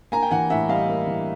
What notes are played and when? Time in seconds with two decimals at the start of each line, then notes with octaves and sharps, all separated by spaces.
0.12 A#3 G#5 A#5
0.23 G5
0.31 E3 F#5 G#5
0.50 A2 E5 F#5
0.69 G3 D#5 F5
0.89 A#3
1.07 E3